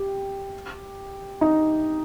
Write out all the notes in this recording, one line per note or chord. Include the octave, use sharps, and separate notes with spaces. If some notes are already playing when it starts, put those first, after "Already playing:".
Already playing: G4
D#4